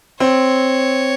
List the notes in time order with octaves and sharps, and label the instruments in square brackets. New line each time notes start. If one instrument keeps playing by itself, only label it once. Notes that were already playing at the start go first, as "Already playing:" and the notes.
[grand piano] C4 [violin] C#5